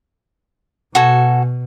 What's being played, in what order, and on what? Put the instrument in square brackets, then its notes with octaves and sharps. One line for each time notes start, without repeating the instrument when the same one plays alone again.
[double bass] B2 [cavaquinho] F#4 A4 G#5